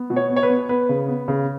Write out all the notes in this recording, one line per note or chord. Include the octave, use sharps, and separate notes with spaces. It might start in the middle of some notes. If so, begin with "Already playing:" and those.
Already playing: B3
B2
C#5
B3
C#5
B4
B3
B3 B4
C#3
B3
C#3